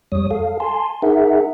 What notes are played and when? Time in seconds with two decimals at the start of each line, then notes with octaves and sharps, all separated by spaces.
0.12 F2 G3 C#5 D#6
0.31 A4 F5
0.60 G#5 A5 C6
1.02 D#4 G#4 A#4 E5 F#5